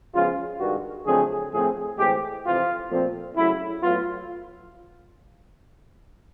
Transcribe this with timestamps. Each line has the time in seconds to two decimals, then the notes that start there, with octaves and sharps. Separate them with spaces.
0.14 C#3 F3 G#3 B3 F4
0.59 G2 D#3 G#3 F#4
1.05 F2 D3 F#3 A3 C4 G#4
1.51 A2 F3 A3 C4 G#4
1.98 A2 E3 G#3 C4 G4
2.45 F2 C3 E3 F4
2.91 A#2 F3 A3 C4
3.36 C#3 F#3 A3 E4
3.83 A2 F#3 B3 F4